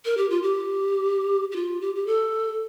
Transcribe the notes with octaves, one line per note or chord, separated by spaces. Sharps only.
A#4
G4
F4
G4
G4
F4
G4
G4
A4